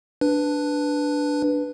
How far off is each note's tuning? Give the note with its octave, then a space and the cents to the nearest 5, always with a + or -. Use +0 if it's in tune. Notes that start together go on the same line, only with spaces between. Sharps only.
D4 +0 B4 +0